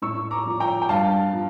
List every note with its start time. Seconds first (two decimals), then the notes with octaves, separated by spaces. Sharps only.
0.02 A2 C#6 E6
0.31 A#5 D6
0.46 F3
0.60 G5 A#5
0.82 G5
0.89 G2 F5 A5
1.32 F3